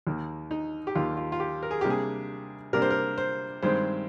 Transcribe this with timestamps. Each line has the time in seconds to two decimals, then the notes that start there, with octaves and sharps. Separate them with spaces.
0.07 D#2 D#3 A#3
0.51 D#4
0.87 G4
0.95 D#2 D#3 A#3 F4
1.17 F4
1.32 F4
1.40 G4
1.63 A#4
1.71 G#4
1.81 C3 G3 A#3 D4 G4
1.90 G#4
2.73 C3 G3 A#3 D4 A#4
2.82 C5
2.90 A#4
3.18 C5
3.62 G2 D#3 G#3 C4 C5